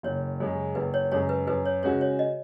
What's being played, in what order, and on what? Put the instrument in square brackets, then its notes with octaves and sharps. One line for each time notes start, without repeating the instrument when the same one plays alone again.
[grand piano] F#1 [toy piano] C#5
[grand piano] F#2 C#3 G#3
[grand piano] F#1 [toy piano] B4
[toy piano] C#5
[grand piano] F#2 C#3 G#3 [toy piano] C#5
[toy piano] B4
[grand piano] F#2 [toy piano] B4
[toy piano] C#5
[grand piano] C#3 G#3 C#4 F#4 [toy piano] C#5
[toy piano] C#5
D#5